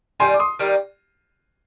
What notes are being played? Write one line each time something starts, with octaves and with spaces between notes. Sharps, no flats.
D#3 G3 A#3 G#5 C6
D6
C6 D#6
D#3 G3 A#3